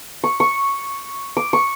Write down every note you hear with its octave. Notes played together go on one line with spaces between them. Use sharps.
C#6
C#6
D6
C#6